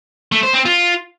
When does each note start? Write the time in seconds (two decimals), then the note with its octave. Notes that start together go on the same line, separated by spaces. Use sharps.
0.32 A3
0.43 C5
0.54 C4
0.65 F4